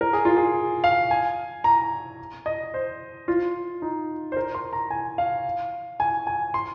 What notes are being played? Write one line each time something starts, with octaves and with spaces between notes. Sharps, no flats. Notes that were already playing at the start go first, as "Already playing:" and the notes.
A#4
G#4
F4
G#4
F5
G#5
A#5
D#5
C5
F4
D#4
C5
A#4
C6
A#5
G#5
F5
G#5
G#5
C6